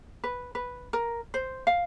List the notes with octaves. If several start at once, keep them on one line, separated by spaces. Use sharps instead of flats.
B4
B4
A#4
C5
F5